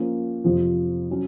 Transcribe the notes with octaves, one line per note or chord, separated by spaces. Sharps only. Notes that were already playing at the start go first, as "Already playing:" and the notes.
Already playing: F3 A#3 C#4
F2 C3 F3
F#3 C#4